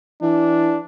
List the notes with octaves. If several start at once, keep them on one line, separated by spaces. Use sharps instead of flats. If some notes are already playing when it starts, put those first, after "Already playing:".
E3 D4